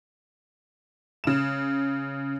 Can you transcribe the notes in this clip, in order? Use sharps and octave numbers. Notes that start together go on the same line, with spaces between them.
C#3 E7